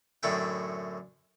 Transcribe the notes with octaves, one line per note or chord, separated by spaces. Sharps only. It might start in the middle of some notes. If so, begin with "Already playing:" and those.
F#2 A2 D3 E4 G5